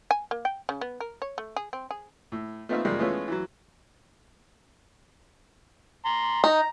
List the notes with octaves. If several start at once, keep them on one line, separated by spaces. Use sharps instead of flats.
G#5
A#3
G5
C#3
B3
A#4
C#5
A3
G#4
C4
G#4
A2
A3 B3 C4 D#4 F4 E5
C#3 F3 G3 G#3 A#3
E3 G#3 A3 B3 C#4 F4
E3 F#3
A#5 C6
D#4 A#5